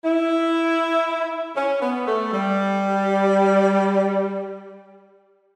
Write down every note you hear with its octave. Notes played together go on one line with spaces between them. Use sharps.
E4
C#4
B3
A3
G3